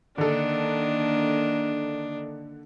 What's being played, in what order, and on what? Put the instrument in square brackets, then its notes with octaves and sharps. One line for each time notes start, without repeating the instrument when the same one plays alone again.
[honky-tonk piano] D3 A4 [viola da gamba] D#3 A#3 [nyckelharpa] D4